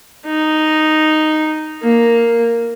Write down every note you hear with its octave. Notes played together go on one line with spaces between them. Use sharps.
D#4
A#3